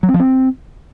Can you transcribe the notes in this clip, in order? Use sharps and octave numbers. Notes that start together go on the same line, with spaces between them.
F#3
C4
F3
C4